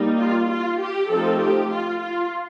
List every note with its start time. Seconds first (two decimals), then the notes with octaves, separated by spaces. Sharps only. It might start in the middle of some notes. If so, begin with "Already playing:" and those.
Already playing: G3 A#3 D#4
0.18 F4
0.49 F4
0.80 G4
1.10 F3 A3 C4 D#4 A4
1.41 G4
1.71 F4
2.02 F4